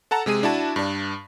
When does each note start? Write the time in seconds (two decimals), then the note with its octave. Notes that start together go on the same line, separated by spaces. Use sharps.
0.11 A4 F#5 A5 A#5
0.26 C3 G#3 G#4 D#7
0.43 D4 E4 F#4 A5
0.76 G2 D4